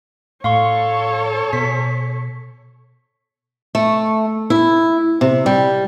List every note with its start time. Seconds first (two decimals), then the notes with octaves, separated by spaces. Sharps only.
0.44 A2 A4 C#5 F5 C6 C#6
1.53 B2 B6
3.75 A3
4.50 E4
5.21 C3
5.46 G3